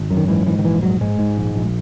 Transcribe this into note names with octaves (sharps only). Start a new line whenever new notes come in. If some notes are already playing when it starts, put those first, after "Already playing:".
Already playing: G#1
F#2
D#3
G#2 E3
G#2 E3
D#3
A#1 E3
G#2 F#3
G#2 G#3
G#2
A#1
A#1